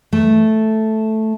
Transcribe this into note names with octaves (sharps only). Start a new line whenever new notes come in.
A3